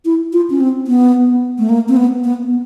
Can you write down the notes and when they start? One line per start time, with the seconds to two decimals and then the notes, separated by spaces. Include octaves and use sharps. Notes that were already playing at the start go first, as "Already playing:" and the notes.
0.05 E4
0.33 F4
0.50 C#4
0.60 C4
0.87 B3
1.59 A3
1.69 A#3
1.89 C4
1.97 B3
2.24 B3